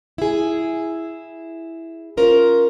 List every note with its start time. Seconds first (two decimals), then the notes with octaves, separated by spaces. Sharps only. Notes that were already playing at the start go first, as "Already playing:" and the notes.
0.18 E4 G#4
2.17 C#4 F4 A#4 C5